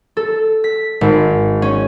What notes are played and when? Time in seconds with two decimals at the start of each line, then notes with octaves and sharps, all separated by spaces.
0.17 A4
0.64 B6
1.01 G#1
1.62 C#4